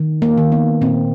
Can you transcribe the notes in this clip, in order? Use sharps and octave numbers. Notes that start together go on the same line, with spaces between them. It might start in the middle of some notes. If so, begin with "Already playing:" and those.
Already playing: D#3
A#3
D#3
B3
A#2 C4